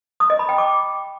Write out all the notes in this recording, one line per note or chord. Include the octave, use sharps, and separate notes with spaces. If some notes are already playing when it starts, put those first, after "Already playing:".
D#6
D#5
B5
G5
D6